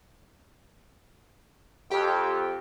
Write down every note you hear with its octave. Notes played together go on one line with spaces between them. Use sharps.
F2 G4 G5